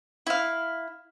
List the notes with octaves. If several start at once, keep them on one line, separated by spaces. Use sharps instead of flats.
E4 F5